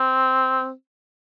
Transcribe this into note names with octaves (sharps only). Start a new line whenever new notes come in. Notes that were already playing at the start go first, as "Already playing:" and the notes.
Already playing: C4